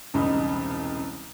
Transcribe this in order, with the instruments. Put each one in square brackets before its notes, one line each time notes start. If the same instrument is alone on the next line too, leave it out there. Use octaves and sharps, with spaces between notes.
[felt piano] E1 C2 C#3 D#4 B5